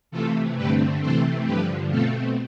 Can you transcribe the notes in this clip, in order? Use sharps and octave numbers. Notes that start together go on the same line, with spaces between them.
C3 E3 A3 F4 A4
G2 D3 A3 C4 G4 B4
C3 E3 A3 C4 A4 C5
G2 D3 F3 G4 B4
B2 A3 C4 F4 A4